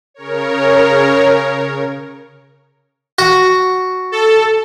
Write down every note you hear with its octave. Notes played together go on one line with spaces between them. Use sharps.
C#3 A#4 C#5
F#4
A4